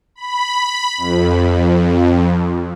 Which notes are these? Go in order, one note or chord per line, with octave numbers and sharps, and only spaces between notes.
B5
F2